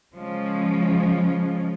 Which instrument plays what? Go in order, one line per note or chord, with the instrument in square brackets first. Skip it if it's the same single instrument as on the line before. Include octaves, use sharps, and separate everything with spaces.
[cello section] C#3 F3 G#3 C#4